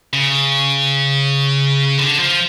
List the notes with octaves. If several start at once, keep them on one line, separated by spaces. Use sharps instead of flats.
C#3
D3
F3